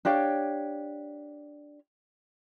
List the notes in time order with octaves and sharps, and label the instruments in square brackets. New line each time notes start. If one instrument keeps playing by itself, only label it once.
[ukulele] D4 G4 C#5 F5